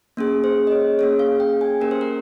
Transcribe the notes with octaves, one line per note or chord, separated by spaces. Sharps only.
A#3 C#4 G#4
C5
D#5
C#5
A#3 C#4 G#4 C#5
F5
G5
G#5
A#3 C#4 G4 A#4
C5
A#4